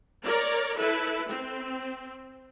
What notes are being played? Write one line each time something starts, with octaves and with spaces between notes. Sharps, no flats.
A#4 C#5 D5
E4 A4 B4
C4